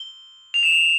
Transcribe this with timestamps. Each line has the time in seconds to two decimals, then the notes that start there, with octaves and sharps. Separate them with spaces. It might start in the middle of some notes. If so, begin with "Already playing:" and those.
Already playing: G7
0.54 F7
0.63 E7
0.72 F7